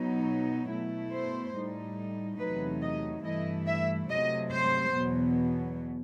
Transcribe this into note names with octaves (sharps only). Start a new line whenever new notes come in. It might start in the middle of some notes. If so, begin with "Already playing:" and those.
Already playing: B2 F#3 B3 D#4
B2 A3 E4
C5
A2 G3 D#4
E2 C3 F#3 A3 D#4 B4
D#5
G2 E3 A3 E4 D#5
E5
C3 F#3 A3 D#5
C5
E2 B2 F#3 B3